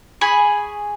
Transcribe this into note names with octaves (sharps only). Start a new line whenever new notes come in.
G#4 G#5 B5 C#6